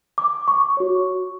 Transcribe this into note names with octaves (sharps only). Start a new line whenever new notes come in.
D6
C#6
F#4 C#5